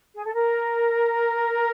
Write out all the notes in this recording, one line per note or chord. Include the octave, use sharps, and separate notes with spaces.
G#4
A4
A#4